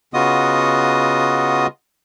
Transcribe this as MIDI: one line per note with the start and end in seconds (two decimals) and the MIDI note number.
0.14 1.67 49
0.14 1.67 59
0.14 1.67 65
0.14 1.67 66
0.14 1.67 75
0.14 1.67 87